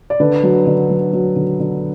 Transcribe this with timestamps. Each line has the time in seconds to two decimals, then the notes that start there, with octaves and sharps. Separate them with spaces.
0.10 D5
0.20 D3 B4
0.43 F#3
0.67 D3
0.90 F#3
1.13 F#3
1.36 D3
1.60 D3